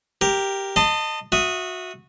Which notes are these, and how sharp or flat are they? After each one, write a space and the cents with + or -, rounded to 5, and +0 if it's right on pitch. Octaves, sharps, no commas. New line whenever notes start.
G4 +0 A#4 +0
D#5 -15 A5 +25 C6 -20
F#4 -20 E5 +0 D#6 +5